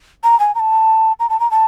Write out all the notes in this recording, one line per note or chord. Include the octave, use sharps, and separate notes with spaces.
A#5
G#5
A#5
A5
A#5
A5
A#5
A5